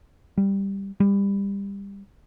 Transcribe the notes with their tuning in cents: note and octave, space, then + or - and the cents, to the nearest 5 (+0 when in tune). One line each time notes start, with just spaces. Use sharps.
G3 +5
G3 +25